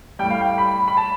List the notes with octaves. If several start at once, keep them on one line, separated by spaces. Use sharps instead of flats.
A2 G3 G5
F5
G5
B5
B5
A5